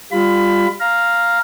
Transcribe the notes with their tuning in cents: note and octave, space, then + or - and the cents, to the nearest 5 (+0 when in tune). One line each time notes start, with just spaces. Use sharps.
G3 +15 F4 +0 B5 +20
F5 +0 A#5 +0